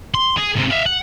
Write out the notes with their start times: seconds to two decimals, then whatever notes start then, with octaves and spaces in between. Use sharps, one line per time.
0.14 C6
0.37 G#4
0.55 G#2 C3
0.70 E5 F5
0.86 F#5